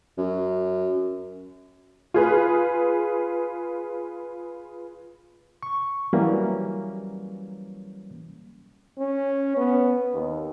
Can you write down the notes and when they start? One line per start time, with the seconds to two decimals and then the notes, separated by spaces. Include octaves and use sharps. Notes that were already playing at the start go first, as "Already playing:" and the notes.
0.18 F#2
2.14 F4 G#4 B4
5.63 C#6
6.13 E3 F#3 G3 A#3 C#4
8.98 C#4
9.57 B3
10.13 D#2